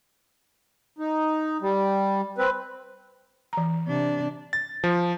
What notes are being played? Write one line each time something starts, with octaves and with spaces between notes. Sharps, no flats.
D#4
G3
C4 B4
E3 A#5
C3 D4
A6
F3